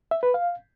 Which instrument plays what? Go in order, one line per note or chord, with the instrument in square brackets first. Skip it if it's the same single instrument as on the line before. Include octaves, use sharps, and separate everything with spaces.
[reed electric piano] E5
B4
F5